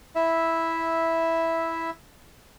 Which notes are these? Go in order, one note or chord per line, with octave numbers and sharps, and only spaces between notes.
E4 E5